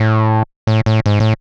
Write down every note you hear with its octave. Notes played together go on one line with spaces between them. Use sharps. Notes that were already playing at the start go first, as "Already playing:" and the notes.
Already playing: A2
A2
A2
G#2
A2